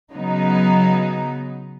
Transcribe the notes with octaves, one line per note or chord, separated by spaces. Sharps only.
C#3 F#3 B3 D#4